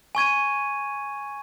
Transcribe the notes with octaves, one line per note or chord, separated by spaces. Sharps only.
G#5 C#6 G#6 D#7